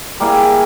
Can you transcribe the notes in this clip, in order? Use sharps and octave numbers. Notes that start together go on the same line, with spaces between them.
G3 A#3 E4 G#4